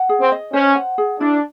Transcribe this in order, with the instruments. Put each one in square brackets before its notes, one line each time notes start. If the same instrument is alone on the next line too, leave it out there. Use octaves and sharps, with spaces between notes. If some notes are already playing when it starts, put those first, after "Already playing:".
Already playing: [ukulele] F#5
G#4
[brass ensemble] C4
[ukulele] D#5
[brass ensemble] C#4 [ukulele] C5
[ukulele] F#5
G#4
[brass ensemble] D4 [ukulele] E4